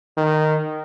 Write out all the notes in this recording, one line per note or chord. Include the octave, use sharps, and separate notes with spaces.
D#3